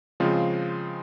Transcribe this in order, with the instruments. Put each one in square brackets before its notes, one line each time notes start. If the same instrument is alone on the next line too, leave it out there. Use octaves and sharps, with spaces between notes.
[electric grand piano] C#3 F3 G#3 C4 F4